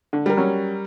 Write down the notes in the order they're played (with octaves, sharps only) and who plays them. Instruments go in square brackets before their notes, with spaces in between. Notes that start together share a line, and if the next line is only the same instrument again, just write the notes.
[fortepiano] D3
[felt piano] G3 A#4
[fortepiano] F#3 C#4